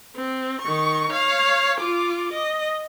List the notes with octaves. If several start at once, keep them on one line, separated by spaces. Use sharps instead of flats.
C4
D#3 C#6
C#5 F5
F4 D6
D#5